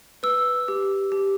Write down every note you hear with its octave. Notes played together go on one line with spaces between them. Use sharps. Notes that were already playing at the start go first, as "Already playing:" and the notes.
B4 E6
G4
G4